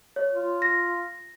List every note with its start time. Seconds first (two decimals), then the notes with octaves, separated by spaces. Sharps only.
0.16 C#5
0.32 F4
0.62 A#6